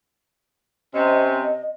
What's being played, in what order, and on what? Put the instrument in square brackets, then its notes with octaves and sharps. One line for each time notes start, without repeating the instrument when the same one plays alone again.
[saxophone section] C3 C#4 [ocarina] D#5